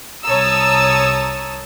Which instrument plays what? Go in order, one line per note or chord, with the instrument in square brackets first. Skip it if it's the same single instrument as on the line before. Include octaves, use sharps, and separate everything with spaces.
[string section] C2 C#5 A5 A#5 D#6 E6